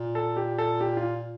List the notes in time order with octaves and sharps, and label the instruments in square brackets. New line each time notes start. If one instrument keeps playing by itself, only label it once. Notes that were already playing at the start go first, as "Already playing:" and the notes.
Already playing: [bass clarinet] A#2
[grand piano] A4
G4
A4
G4
F4